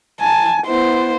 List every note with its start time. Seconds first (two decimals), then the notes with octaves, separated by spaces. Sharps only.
0.21 G#5 A5
0.67 B3 E4 C5